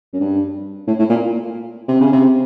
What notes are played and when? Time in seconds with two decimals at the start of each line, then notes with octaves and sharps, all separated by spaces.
0.13 F#2
0.20 G2
0.87 A2
0.99 A2
1.09 A#2
1.88 C3
2.00 C#3
2.12 C3